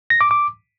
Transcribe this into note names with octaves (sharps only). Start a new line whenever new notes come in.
A#6
D6
D6